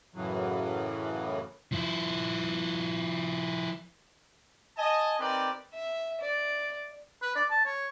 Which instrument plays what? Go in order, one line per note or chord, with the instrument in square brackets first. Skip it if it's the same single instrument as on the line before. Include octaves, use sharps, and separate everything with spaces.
[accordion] F#2 A2 C#3 E3 F#3
[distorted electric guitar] F3 E4
[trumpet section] D#5 G#5 A5
C4 D#4 G4 A#4 B4 D5
[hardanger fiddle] E5
D5
[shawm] B4
D5
A5
C#5